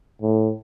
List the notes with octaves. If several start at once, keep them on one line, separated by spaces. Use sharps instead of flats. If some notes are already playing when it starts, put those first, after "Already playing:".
A2